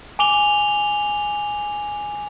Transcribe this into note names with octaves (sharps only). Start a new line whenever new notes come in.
G#5 D6 F7 G7